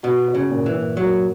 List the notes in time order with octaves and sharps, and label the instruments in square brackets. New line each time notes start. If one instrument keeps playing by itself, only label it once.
[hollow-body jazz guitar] B2 [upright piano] F#4
[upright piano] F#4
[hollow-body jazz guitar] C#3
[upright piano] A#2
[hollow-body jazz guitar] E3
[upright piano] A#2
[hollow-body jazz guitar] F#3 [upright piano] A#3